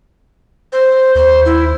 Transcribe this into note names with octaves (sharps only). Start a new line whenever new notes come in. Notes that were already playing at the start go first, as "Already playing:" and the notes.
C5
D#2 C5
E4